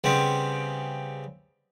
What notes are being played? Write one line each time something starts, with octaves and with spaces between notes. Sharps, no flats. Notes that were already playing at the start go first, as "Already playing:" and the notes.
C#3 G3 B3 C4